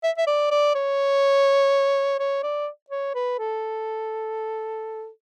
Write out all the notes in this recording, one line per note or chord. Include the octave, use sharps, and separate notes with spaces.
E5
E5
D5
D5
C#5
C#5
D5
C#5
B4
A4